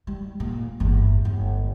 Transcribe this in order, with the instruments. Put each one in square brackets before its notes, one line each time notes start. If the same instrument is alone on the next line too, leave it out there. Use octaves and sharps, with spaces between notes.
[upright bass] G3
A#2
G1 E2
G1